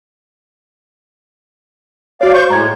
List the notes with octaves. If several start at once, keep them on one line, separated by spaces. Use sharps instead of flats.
F#4 C#5 D5 F5 D6
C5 C#6 G6
A2 G#3 A#5 G#6